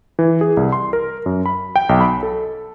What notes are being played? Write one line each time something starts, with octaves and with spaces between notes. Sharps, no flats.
E3
G#4
C2
C6
A#4
F#2
B5
G5
B1
B5
A4